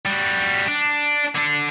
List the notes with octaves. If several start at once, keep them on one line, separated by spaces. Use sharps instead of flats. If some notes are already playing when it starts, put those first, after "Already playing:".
G3 F#4
D4
D3 D4